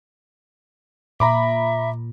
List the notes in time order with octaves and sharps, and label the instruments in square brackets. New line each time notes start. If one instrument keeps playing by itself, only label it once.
[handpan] A#2 [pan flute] E5 [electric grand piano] A#5 B5 D6